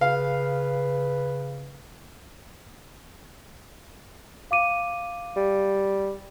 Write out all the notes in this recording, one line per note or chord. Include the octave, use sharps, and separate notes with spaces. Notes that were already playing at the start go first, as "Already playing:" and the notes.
C#3 B4 F5
F5 D6 D#7
G3